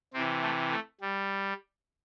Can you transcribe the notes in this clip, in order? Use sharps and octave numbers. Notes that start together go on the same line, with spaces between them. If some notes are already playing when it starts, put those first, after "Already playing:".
C3 E3 C4
A3
A3
G3